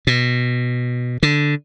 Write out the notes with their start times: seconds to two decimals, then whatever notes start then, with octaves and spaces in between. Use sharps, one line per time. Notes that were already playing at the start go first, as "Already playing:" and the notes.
0.07 B2
1.23 D3